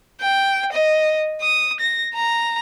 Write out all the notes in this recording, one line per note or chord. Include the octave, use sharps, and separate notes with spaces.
G5
D#5
D#6
A#6
A#5